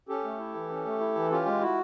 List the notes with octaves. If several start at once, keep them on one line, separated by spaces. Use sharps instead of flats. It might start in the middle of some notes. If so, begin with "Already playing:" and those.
C#4 G4 A4
A3
E4
E3
C#4
A3
E4
E3
C#4 F4 G4
G#3
E4 F#4